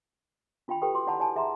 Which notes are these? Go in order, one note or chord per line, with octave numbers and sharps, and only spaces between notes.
D4 F4 F5 G5 B5
G4 A4 B4 G5
F#4 D5 C6 D6
E4 D5 F#5 A5 B5
E4 D5 F#5 G#5 A5
G#4 E5 F#5 A#5 C6